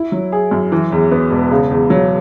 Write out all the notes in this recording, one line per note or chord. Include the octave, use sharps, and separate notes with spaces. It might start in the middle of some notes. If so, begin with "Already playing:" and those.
Already playing: E4
F#3
G#4
F#2
E3
E2
B3
E1
C#3
E2
F#3